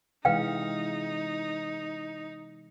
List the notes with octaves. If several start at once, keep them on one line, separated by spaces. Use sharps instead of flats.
C3 E3 G#3 D#4 B4 F5 G5